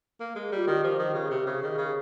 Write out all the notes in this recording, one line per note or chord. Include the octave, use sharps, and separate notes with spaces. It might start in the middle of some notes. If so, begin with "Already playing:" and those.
A#3
G#3
G3 F4
D#3 G4
F3
D#3
C#3
C3
C#3
D#3 G#4
C#3